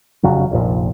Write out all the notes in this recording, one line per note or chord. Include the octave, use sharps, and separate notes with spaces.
F1 C#3 F#3
F1 A#1 A#2